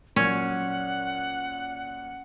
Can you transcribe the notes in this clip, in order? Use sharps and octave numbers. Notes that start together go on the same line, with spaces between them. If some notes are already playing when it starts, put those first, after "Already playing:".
A#2 F#3 C#4 F#5